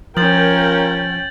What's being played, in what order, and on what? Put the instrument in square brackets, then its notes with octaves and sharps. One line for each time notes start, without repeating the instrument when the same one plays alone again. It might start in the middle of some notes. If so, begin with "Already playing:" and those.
[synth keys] F3 [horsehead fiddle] C#4 G5 [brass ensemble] F4 A#4 [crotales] G6 A6 F#7